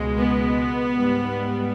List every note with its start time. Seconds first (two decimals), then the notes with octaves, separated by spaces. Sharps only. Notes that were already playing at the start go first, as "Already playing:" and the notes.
Already playing: C#2 B2 G#3
0.17 B3
0.96 G#2 G3